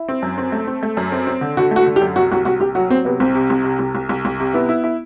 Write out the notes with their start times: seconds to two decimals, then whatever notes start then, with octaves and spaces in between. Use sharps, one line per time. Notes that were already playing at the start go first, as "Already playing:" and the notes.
Already playing: E4
0.09 C4
0.22 F#2
0.38 C4
0.52 A3
0.67 C4
0.83 A3
0.97 F#2
1.12 C4
1.27 C4
1.41 D3
1.57 D3 F#4
1.71 A3
1.76 F#4
1.86 D3
1.96 G4
2.01 F#2
2.16 C2 F#4
2.32 C2 F#4
2.45 C2 F#4
2.60 C2 G4
2.75 F#3 F#4
2.90 F#3 C4
3.05 C3 B3
3.20 C2 C4
3.35 C3
3.50 C2
3.64 C3
3.79 C2
3.95 C2
4.09 C2
4.25 C2
4.40 C3
4.54 B3 E4
4.69 E4
4.84 E4